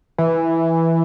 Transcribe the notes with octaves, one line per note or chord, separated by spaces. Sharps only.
E3